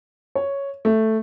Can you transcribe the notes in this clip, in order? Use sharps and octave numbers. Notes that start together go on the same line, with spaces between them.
C#5
A3